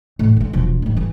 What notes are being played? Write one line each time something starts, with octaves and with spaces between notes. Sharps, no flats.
A2
D3 G#3
E1 F3
A1 G#2
E3 G3